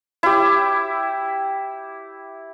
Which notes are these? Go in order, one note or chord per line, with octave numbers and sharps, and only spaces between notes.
E4 G4